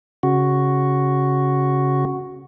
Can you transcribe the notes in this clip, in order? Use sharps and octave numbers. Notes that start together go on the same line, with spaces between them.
C#3 F#4